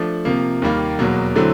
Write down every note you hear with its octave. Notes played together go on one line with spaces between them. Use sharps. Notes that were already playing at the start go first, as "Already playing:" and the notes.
Already playing: F3 A3 D4
C3 F3 A#3
D#2 D#3 G3 A#3
E2 B2 F#3 A#3
D3 F#3 A3 C4 E4